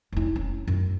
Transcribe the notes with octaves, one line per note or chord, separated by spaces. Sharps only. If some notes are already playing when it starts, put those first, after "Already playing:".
F1 E4
C#4
F#2